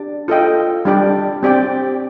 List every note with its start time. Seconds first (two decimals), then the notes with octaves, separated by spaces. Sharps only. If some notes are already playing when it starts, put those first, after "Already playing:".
Already playing: D4 G4 D5
0.28 F4 A4 D#5 G5
0.85 G3 D4 G4 D5 G5
1.43 C4 G4 D5 G5